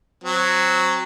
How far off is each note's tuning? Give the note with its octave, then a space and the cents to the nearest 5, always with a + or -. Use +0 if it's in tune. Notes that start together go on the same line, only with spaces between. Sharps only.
F#3 +0 C4 +0